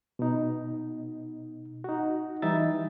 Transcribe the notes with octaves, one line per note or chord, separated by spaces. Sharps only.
B2 D#4
D#4 F#4
E3 G3 D#4 E5 A6